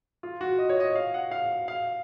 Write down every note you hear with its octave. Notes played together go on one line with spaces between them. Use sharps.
F4
F#4
D#5
C#5
D#5
F5
F#5
F5
F5